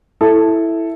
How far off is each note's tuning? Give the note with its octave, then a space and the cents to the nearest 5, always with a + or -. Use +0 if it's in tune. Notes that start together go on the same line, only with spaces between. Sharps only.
E4 +0 A4 +0